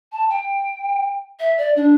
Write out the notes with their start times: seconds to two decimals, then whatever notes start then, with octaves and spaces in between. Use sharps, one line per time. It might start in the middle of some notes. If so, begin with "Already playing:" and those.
0.12 A5
0.30 G5
1.39 E5
1.58 D5
1.76 D4